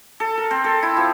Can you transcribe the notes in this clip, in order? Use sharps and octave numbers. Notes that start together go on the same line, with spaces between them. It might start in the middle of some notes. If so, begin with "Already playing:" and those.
A4
A#4
C4
A4
E4
F3